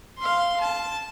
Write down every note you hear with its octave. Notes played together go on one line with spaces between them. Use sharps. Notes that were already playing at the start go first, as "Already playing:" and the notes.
F5 C6
A5